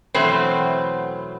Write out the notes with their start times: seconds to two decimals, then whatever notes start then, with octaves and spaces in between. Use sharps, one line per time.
0.14 E2 B2 F#3 A3 C4